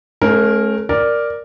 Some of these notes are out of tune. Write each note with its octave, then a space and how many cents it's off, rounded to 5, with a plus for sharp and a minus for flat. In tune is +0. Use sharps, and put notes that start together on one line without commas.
A3 -45 C#4 -35 A#4 +0
A#4 +0 D5 +0